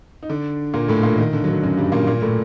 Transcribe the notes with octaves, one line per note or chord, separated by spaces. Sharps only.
D#4
D3 D4
A#2 A#3
A2 A3
A#2 A#3
D#3
D3
F#3
D#3
F#2 F#3
G2 G3
A#2 A#3
A#2 A#3
A2 A3